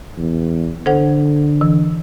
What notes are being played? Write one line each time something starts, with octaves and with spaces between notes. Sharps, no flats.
E2
D3 A4 C5 F#5
E3